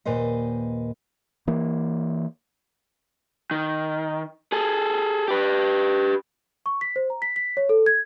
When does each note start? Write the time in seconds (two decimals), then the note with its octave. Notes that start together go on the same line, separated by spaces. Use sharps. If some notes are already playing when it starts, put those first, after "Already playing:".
0.05 D#2 A#2 B4 C5 D#5
1.47 E3 A#3
3.51 D#3
4.52 G#4 A4
5.28 G4 B4
6.66 C#6
6.81 B6
6.96 C5
7.10 A#5
7.22 B6
7.36 B6
7.57 C#5
7.69 A4
7.86 G#6